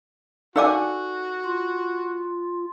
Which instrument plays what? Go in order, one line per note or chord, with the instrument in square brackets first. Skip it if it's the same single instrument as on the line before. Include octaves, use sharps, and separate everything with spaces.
[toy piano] D#4 D5 D6 [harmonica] F#4 [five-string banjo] A4 F#5 G#5
[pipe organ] F4